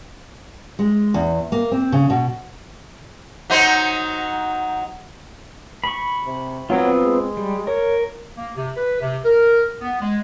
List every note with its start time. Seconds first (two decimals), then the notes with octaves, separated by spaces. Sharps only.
0.79 G#3
1.14 E2
1.52 A#3
1.72 C4
1.92 C#3
2.10 B2
3.50 F#3 D#4 C5
5.84 B5 C#6
6.26 C3
6.70 F#3 B3 C4 F4
7.03 G#3
7.37 G3
7.67 A#4 C#5
8.37 A#3
8.55 C3
8.76 B4
9.00 C3
9.25 A#4
9.81 B3
10.00 G#3